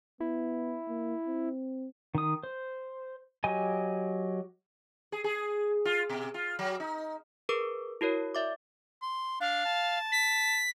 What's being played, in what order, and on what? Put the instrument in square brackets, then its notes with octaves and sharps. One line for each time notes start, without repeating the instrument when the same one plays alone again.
[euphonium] B3 [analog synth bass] E4
[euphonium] A#3
C4
[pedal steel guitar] D#3 D#6
C5
F#3 G4 D#5 G#5
[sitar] G#4
G#4
F4
B2
F4
F#3
D#4
[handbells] G#4 A#4 B4 D6
E4 F#4 A#4 C#5
D5 E5 D6
[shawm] C6
[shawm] D4 [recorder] F5
[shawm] A5
[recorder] B6